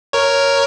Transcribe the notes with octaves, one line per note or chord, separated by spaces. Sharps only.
A#4 C#5